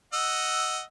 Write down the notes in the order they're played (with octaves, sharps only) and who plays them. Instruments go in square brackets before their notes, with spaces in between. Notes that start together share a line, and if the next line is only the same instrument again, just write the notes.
[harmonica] D#5 F#5 E6